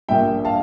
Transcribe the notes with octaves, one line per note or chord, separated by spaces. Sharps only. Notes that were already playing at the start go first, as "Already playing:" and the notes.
A#1 A#2 G3 E5 G5
F5 A5